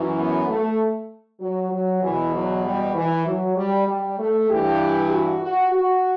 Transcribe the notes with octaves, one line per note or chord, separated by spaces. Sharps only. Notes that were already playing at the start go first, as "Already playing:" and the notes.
Already playing: F#2 E3
B3
A3
F#3
F#3
E2 B2 E3
F#3
G3
E3
F#3
G3
G3
A3
G2 E3 G4
F#4
F#4
F#4